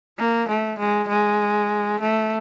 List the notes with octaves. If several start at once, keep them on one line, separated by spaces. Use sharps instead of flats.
A#3
A3
G#3
G#3
A3